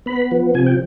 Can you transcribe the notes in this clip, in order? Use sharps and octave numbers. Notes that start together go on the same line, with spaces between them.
B3 B5
F3
C3 G#5
G5